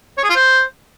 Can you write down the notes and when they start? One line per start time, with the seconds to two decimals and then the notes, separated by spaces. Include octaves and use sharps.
0.18 C#5
0.24 G#4
0.30 F4
0.36 C5